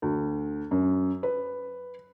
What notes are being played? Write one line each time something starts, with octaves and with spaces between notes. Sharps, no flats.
D2
F#2
B4